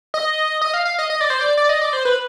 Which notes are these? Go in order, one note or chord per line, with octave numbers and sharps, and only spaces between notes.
D#5
D#5
F5
F5
D#5
D#5
D5
C5
D5
D5
D#5
D5
C5
B4